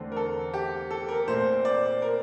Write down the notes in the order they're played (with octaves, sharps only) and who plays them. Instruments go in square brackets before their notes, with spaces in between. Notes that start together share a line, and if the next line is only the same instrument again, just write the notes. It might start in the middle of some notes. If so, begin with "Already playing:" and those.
Already playing: [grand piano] E2 D3 A3 C4
A#4
A4
G4
A4
A#4
A#2 A3 C4 C5
D5
A#4